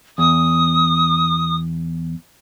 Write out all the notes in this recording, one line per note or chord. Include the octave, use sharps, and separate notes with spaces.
E2 D#6